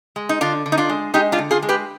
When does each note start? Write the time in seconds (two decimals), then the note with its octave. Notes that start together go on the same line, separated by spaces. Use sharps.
0.16 G#3
0.29 D#4
0.41 D3 D4 F4
0.66 D3
0.72 D#4
0.78 D4 F4
0.89 G#3
1.14 G#3 D#4 G4
1.32 D4 F4
1.38 D3
1.51 F4 G#4
1.62 G#3
1.69 G4 B4